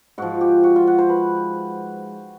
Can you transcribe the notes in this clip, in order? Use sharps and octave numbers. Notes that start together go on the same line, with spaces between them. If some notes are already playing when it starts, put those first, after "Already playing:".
G#2 F3 F#4
G4
F#4
F4
F#4
C5
B4